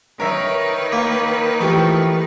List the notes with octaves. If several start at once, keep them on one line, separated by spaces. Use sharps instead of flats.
D#3 A#4 B4 C#5 E5
A#3
E3 F3 A3 G4 G5 C#6